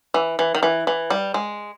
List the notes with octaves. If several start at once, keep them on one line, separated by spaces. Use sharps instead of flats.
E3
E3
D#3
E3
E3
G3
G#3